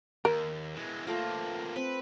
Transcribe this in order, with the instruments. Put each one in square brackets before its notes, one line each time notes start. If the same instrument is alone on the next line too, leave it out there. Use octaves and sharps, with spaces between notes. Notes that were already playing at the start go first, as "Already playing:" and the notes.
[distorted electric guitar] D#2 [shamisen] A#4
[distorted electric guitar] E3 G#3
[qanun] A3 F4 [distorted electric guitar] A#3 C4
[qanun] C4 [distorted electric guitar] B4